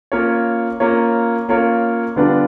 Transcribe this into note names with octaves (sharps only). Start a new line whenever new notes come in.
A#3 C#4 F4 A#4 C#5
A#3 C#4 F4 A#4 C#5
A#3 C#4 F4 A#4 C#5
D3 G3 B3 D4 F4